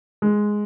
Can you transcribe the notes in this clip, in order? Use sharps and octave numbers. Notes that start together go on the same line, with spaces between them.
G#3